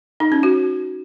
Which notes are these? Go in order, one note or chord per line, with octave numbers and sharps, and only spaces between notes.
D#4
C#4
F#4